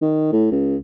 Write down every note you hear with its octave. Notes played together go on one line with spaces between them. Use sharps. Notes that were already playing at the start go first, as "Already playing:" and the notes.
D#3
A2
C#2